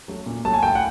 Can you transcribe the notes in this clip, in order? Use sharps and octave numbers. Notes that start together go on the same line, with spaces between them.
F#3 A3
A#2
F#3 A3 A5
G#5
A2 G5
F#5